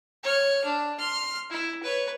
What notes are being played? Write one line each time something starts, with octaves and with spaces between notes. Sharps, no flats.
C#5 F6
D4
C6 F6
E4
B4 C#5